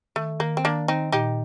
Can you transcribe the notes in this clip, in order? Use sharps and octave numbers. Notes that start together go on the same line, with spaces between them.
D#3 A3
D#3 A#3
C4
D#3 A#3 D4
D#3 C4 D#4
A#2 D#4 G4